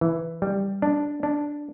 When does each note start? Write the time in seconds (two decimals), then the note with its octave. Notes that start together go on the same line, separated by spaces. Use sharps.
0.01 E3
0.42 G3
0.82 D4
1.23 D4